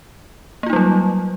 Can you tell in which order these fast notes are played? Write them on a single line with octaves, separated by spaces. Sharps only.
A#3 F4 D#4 G3 F#3